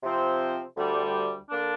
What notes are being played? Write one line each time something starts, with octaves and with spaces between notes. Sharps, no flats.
C3 F3 C4
D2 D3 G3
D3 A#3 D4